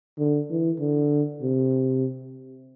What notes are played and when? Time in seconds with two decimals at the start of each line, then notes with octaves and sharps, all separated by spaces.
0.18 D3
0.50 E3
0.80 D3
1.42 C3